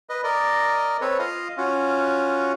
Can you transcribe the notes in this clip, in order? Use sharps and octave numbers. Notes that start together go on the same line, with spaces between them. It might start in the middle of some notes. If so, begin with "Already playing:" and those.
B4 D#5
A#4 D5 D#5
C4 A4 B4 C#5
F4 D#5 F5 D#6
C#4 F4 F#4